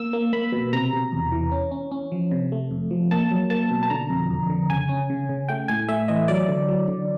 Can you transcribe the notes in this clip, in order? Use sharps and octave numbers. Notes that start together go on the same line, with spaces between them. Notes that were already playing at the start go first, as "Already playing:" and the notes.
Already playing: A#3 E6
A#3
A#3 B5
B2
C3 A#5
C3
E2
E3
C#4
C#4
C#4
F3
C3
A3
F2
F3
A#3 A5
F#3
A#3 A5
B2
A5
D3 A#5
F2
F2
D3
C#3 G#5
C#4
C#3
C#3
A3 G5
A2 G#5
A3 E5
E3 D#5
F#3 D5
D3
F#3
D3